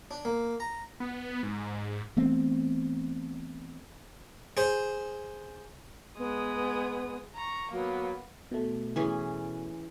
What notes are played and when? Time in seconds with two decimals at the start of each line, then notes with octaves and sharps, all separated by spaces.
0.11 D4
0.25 A#3
0.60 A#5
1.00 B3
1.43 G#2
2.17 E3 A3 B3 C4
4.57 G#4 C5
6.18 G#3 B3 D#6
7.35 A#5 C#6
7.71 F#3 A#3 B3
8.51 B2 A3
8.96 E3 C#4 G#4